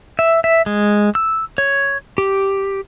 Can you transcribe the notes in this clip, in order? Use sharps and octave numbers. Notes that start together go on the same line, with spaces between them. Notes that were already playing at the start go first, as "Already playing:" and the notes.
E5
E5
G#3
E6
C#5
G4